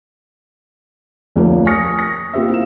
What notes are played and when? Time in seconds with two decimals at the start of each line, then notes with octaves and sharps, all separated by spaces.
1.36 F1 D2 F3 A#3 A#4 C#5
1.66 G#5 C#6 D#6 F6 A#6 C#7
1.99 A#6
2.33 A#3 F4 G4 C5 E5
2.49 E4 F5 E7